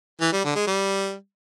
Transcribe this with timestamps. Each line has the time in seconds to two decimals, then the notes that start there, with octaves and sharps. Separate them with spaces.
0.21 E3
0.33 G3
0.44 D3
0.56 G#3
0.67 G3